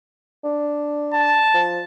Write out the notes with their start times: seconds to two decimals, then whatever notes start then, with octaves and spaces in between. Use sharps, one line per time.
0.44 D4
1.13 A5
1.54 F3